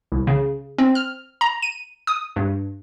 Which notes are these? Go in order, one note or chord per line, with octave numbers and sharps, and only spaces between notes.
C2
C#3
C4
F6
A#5
D#7
D#6
G2